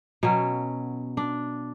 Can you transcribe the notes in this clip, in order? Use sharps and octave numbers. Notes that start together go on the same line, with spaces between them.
B2 F#3 C#4
D4